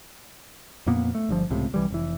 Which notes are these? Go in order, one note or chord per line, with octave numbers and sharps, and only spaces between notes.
F2 A#2 A#3 B3
A3
G1 G2 F3
C#2 A2 C3
C2 E3 G3
F1 E3